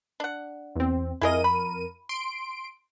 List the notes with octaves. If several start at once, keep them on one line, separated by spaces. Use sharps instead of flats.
D4 F#5
E2 C4
F2 E4 G#4 A#4 D#5 D#7
B5
C6 D7